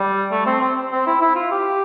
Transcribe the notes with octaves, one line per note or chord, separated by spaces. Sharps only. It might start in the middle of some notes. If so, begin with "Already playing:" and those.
Already playing: G3
A3
C4
C4
C4
E4
E4
F4
G4